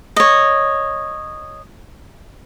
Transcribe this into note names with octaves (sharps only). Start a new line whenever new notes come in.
C#5 D#5